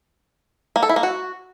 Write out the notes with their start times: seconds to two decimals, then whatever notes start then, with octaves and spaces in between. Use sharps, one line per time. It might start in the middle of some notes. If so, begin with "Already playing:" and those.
0.76 A#3
0.83 A4
0.89 E4
0.96 A#3
1.03 F#4